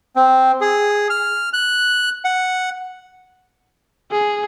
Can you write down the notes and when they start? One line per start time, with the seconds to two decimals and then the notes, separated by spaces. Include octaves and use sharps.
0.16 C4
0.61 G#4
1.10 F6
1.53 F#6
2.25 F#5
4.11 G#4